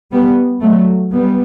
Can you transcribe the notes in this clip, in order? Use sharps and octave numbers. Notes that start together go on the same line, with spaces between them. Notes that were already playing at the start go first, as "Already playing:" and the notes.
G3 B3
F#3 A3
G3 B3